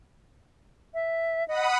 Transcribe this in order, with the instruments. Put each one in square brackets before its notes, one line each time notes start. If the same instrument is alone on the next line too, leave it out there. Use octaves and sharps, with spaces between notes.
[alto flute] E5
[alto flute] D#5 [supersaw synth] F#5 B5 D#6